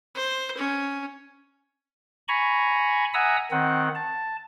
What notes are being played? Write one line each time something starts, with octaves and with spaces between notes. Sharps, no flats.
C5
C#4
G#5 A#5 B5 C#6
E5 F#5 G#5 A#5 D#6 E6
D#3 C4 F#5
A5